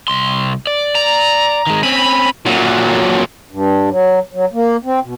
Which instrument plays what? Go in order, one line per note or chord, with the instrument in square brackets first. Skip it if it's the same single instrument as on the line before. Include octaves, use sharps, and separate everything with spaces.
[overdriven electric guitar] C2 C6
D5
[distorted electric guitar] A#5
[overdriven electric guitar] D#3 G#3
[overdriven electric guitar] C4 C#4 [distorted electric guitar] B5
[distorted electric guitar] A#2 F#3
[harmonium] G2
F#3
F#3
A#3
C4
B2